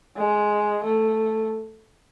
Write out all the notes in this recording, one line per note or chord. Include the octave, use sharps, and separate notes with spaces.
G#3
A3